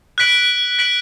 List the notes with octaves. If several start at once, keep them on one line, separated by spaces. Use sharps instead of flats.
F#6 B6 D7 F#7
F#6 B6 D7 F#7